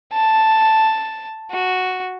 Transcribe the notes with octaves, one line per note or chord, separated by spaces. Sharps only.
A5
F#4